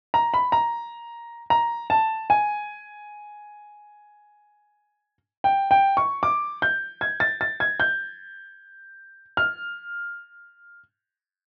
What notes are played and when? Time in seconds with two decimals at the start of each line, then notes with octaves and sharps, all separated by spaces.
0.14 A#5
0.34 B5
0.52 A#5
1.50 A#5
1.90 A5
2.30 G#5
5.44 G5
5.71 G5
5.97 C#6
6.23 D6
6.62 G6
7.01 G#6
7.20 A6
7.41 A6
7.60 G#6
7.80 G6
9.37 F6